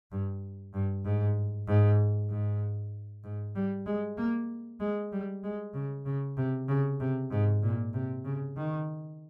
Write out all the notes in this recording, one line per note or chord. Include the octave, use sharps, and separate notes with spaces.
G2
G2
G#2
G#2
G#2
G#2
G3
G#3
A#3
G#3
G3
G#3
C#3
C#3
C3
C#3
C3
G#2
A#2
C3
C#3
D#3